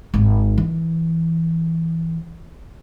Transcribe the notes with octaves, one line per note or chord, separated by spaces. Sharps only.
G#1
E3